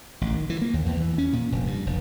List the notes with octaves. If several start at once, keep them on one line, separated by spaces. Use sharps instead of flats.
A1
D#3
E3
A#3
D#2
E2
E3
C#4
A#2
F1
G2
F1